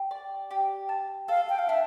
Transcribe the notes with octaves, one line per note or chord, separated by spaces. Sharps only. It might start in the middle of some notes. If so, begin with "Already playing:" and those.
Already playing: G4
D5
G4
A5
A4 F5
G5
F5
D4 E5